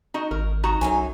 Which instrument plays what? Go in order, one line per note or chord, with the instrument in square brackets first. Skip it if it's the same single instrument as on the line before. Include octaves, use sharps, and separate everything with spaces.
[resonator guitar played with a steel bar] D#4 F#4 D#5
[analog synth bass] G#1 [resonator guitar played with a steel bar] A#4
[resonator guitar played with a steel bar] D#4 F#4 A#5
[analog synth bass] B1 [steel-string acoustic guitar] F#2 F#3 G#5